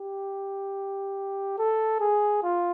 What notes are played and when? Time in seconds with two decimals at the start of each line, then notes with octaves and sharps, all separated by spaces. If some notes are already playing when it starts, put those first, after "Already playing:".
Already playing: G4
1.58 A4
2.00 G#4
2.43 F4